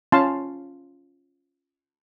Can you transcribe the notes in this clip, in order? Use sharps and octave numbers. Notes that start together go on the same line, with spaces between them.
C#4 F4 F5 A5 C6